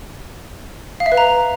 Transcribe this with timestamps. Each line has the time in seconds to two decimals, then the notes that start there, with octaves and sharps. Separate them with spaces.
1.00 F5
1.06 E5
1.12 B4
1.17 A#5